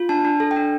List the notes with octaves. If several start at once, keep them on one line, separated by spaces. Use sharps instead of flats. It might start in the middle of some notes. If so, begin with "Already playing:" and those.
Already playing: F4
D4 A5
D4
A4
G5
D4